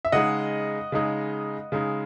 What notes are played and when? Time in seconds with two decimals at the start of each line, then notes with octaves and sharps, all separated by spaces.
0.05 E5
0.12 C#3 G#3 D#4 D#5 F#5
0.92 C#3 G#3 D#4
1.72 C#3 G#3 D#4